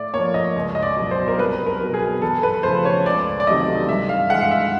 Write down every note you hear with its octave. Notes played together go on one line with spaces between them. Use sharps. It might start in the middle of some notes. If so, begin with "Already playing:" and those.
Already playing: A2 D5
F3 A#3 C#5
D#5
C#2
D#5
D5
B2 F#3
C5
A#4
C2 B4
A#4
B2 F#3
G#4
E2 A4
B4
C#3 F3 A3 C5
C#5
C#2 D5
D5
C3 D#3 F#3 A3 D#5
G2 E5
F5
E3 G#3 F#5
F5
E5